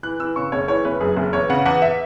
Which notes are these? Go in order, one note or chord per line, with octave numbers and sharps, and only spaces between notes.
E3 F#6
E3 E6
C#3 C#6
F#1 C#5
E3 C#5
F#1 B4
F#2 G#4
F#1
E2 C#5
C#3 F#5
E2 F#5
E5